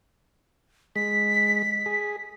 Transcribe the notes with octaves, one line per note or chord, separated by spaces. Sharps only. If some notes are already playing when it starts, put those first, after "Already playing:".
G#3 B6
G#4